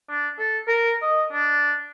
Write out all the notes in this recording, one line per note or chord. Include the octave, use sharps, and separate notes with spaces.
D4
A4
A#4
D#5
D4